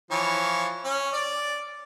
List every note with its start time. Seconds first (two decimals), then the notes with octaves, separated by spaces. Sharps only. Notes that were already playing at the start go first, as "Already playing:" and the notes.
0.11 E3 F3 C#5
0.85 C#4
1.14 D5